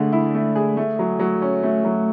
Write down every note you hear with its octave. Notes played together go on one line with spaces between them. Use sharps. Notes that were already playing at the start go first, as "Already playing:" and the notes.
Already playing: D3 A3 G#4
E4
A3
G#4
A3
F#3
F#3
C#4
A3
F#3